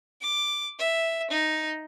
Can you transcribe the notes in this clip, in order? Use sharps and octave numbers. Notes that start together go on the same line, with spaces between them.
D6
E5
D#4